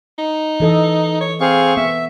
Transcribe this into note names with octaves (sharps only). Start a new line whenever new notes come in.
D#4
E3 A4 D#5
C#5
C4 G#4 F5 C#6
B3 E5